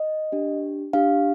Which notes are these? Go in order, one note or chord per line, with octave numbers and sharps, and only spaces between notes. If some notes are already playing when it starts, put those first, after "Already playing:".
Already playing: D#5
D4 G4
D4 G4 F5